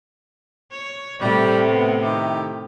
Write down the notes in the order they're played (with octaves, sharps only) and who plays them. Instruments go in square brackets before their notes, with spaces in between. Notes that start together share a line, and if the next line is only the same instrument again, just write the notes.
[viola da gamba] C#5
[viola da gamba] A2 C3 A3 [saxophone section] G3
[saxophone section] B3
D#3 E4 G4